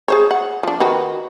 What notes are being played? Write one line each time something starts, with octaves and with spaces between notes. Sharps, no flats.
G#4 C5 C#5
F#5
F3 D4
D#3 F#4 B4